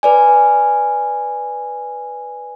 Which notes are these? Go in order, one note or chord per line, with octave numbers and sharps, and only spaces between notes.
B4 D5 G#5